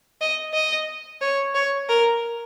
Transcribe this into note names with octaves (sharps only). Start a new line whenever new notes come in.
D#5
D#5
C#5
C#5
A#4